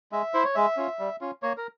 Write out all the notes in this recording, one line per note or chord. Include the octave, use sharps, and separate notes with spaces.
G#3 E5
E4 C5
C#5
G#3 E5
C#4 F4
G3
C#4 F4
A#3 C#5
A#4